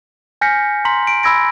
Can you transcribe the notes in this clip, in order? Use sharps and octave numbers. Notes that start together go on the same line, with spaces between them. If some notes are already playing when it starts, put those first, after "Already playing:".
G#5 F6 G6 A#6 B6 C#7
A#5 C6 B6 F#7
D7
B5 E6 G#6 A#6 D7